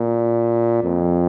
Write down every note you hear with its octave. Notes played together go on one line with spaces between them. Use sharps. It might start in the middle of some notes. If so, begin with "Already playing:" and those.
Already playing: A#2
F2